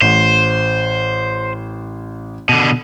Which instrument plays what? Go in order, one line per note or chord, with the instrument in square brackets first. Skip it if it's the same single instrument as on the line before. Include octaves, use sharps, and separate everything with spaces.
[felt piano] A1 [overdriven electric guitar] C5
[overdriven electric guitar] B2 D3